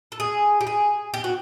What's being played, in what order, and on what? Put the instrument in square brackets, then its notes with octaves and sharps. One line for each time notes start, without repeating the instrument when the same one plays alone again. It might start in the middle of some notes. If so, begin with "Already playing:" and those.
[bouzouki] A4
G#4
G4
G#4
G4
F#4